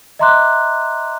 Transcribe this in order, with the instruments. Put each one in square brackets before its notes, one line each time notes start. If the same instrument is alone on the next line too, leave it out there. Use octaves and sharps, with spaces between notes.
[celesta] D#5 E5 A#5 C6 D6 F#6